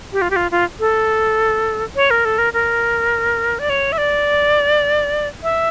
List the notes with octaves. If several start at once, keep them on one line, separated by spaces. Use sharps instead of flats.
G4
F4
G4
F4
F4
A4
C#5
A#4
A4
A#4
A#4
D5
C#5
E5
D5
E5